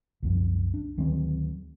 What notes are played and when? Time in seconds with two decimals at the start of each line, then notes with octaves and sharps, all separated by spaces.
0.23 C2 F#2 F3
0.74 D4
0.98 D2 D#3 F#3 C4